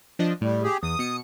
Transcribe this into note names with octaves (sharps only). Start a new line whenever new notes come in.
F3 D4 D#5
A2 G3
G4 G#4
E2 D#6
B2 C#7